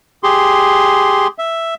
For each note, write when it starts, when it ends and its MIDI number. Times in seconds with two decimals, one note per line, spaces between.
0.23 1.27 67
0.23 1.27 68
0.23 1.27 84
1.38 1.75 76